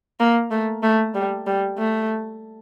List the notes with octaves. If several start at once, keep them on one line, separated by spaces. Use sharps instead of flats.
A#3
A3
A3
G3
G3
A3